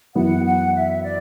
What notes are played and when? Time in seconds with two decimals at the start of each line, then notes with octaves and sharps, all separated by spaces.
0.15 F#2 E3 B3 E4 F#5
0.45 F#5
0.74 E5
1.03 D5